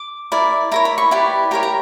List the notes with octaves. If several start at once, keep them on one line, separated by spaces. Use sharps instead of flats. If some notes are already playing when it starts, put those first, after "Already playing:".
Already playing: D6
E4 A#4 D5
E4 A#4 C#5 A#5
B5
C#6
E4 G4 B4 D5
G4 A#4 C#5 A#5
A#5